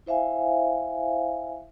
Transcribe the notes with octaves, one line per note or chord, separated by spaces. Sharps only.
E4 C5 E5 F5 G#5